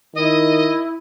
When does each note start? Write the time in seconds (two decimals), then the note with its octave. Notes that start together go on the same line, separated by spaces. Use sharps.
0.15 D#3 E4 D#5